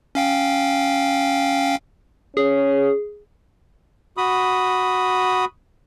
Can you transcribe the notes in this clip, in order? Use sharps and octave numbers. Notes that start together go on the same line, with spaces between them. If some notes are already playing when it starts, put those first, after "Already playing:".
C#4 F5 G5
C#4 G#4
F#4 B5 D#6